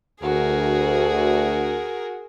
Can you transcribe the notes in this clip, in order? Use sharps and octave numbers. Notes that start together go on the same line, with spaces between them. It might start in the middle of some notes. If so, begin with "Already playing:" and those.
D2 F#4 G#4 A#4